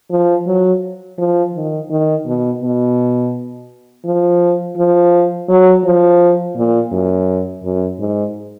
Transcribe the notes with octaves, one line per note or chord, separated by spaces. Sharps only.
F3
F#3
F3
D#3
D#3
B2
B2
F3
F3
F#3
F3
A#2
F#2
F#2
G#2